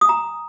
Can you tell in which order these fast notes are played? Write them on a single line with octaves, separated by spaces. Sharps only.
D#6 G#5 A#5